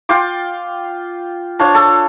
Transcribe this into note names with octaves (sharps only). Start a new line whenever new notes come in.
F4 G5 C6 D6
D4 F4 C5 C#5
A4